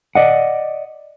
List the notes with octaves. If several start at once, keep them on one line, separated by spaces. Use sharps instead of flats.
D5 D#5 F#5